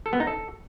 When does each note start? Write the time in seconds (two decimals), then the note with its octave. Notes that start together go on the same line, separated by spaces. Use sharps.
0.06 A4
0.13 B3
0.20 D#4
0.27 A4